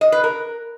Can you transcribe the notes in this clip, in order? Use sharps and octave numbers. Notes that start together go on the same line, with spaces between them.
D#5
B4
A#4